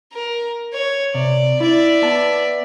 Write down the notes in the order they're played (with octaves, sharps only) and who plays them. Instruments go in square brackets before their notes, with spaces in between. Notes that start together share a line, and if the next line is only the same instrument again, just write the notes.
[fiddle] A#4
C#5
[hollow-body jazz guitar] C3 [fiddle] D5
[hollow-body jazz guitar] E4 [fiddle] D5 E5
[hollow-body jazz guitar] B3 A5